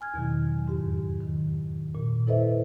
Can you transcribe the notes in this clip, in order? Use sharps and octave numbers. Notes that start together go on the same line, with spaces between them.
G#5 F6 G#6
E2 B2 D#3 F#3
F2 G#2 G4
D#3
A#2
E4 A4 B4 C5 D#5 E5